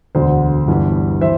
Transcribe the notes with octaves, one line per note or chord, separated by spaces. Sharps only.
E1 D2 D3 C5
G1 G2 E3
E3 C5 E5